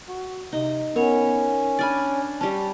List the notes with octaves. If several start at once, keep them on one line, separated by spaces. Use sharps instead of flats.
F#4
C3 D#4
B3 C#4 A#4 C#5
D4 D5 G#5 B5 F6 A6
G3 C#4 A5